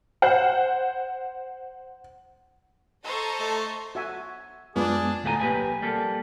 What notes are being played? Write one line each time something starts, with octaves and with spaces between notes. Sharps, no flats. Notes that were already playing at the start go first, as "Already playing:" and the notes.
C5 F#5
A4 C5 D#5 A#5 C#6
A3
F#4 E5 G#5
F#2 G#3 B3 D4 F4 G#4 B4 D5
D2 A2 A3 F#4 G#5 A#5
B1 A#3 G4 B4 G#5
G3 A#3 A4